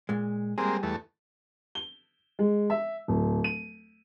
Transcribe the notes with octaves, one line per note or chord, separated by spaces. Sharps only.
A#2 G#3
G3 G#3 A#3 C4 G#4
E2 A3
G7
G#3
E5
D1
D#7